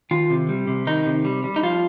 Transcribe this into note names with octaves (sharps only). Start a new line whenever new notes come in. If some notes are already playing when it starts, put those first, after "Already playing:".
D#3 F4
C3
G3
C3
D#3 D#4
C3
G3
G3
D#4
F3 F4